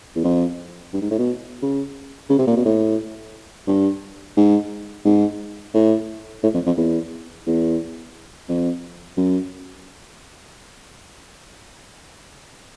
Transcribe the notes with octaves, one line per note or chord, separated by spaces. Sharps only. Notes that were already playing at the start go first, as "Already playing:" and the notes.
E2
F2
G2
G#2
A2
B2
C#3
C#3
C3
A#2
B2
A2
G2
G#2
G#2
A2
A2
F2
F2
E2
E2
F2
F#2